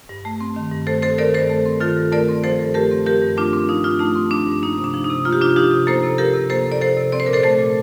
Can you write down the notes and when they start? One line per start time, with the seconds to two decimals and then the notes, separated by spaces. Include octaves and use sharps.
0.09 G2
0.25 A3
0.41 C4
0.56 D#3
0.72 G2
0.87 A3 A4 C5
1.02 C4 A4 C5
1.18 D#3 A#4 D5
1.34 G2 A4 C5
1.49 A3
1.65 C4
1.81 D#3 F4 A4
1.96 G2
2.12 A3 A#4 D5
2.28 C4
2.44 F3 A4 C5
2.59 G2
2.74 A3 G4 A#4
2.91 C4
3.06 F3 G4 A#4
3.22 G2
3.37 A3 D4 F4
3.53 C4 D4
3.69 F3 D#4
3.84 G2 D4 F4
3.99 A3 D#4
4.15 C4
4.31 F3 D4
4.46 G2
4.62 A#3 D#4
4.78 C3
4.84 D4
4.94 F3
5.04 D#4
5.09 C3
5.25 A#3 F4
5.33 G4
5.41 C3 D4 F4
5.56 F3 D#4 G4
5.71 C3
5.87 A#3 A4 C5
6.03 C3
6.18 F3 G4 A#4
6.34 C3
6.50 A#3 A4 C5
6.66 C3
6.72 D5
6.81 F3 A4 C5
6.97 C3
7.12 C4 D5
7.20 C5
7.26 A#2 A#4
7.33 A4 C5
7.43 A3 A4 C5
7.59 A#2